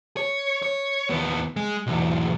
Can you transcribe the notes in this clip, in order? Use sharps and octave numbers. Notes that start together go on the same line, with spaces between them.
C#5
C#5
D#2 B3
G#3
B1 E2